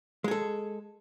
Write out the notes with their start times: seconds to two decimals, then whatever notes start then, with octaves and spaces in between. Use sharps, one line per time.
0.24 G#3
0.28 G#4
0.31 A4